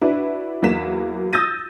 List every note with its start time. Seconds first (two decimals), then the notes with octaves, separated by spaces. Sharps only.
0.02 D4 E4 F#4 B4
0.62 E2 F#3 A#3 F#4 B6 E7
1.33 D#6 E6 G6 A6 A#6 D#7